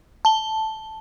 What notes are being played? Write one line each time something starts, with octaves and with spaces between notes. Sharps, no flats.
A5 G7